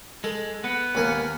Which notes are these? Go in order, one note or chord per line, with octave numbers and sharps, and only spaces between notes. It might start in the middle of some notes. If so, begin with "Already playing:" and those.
G#3 A4
B3 F#5
D#2 A#3 G#5 A5